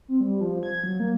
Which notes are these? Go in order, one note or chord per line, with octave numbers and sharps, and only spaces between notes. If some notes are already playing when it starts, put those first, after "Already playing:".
C4
G3
F3
G#6
F#3
A#3